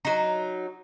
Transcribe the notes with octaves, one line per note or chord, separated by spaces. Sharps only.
F#3 D#4